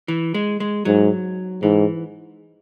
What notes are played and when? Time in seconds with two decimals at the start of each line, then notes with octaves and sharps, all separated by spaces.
0.08 E3
0.34 G#3
0.60 G#3
0.85 G#2 F#3
1.62 G#2 E3